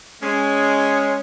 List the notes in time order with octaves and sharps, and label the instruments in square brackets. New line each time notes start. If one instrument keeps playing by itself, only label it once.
[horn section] G#3 C#4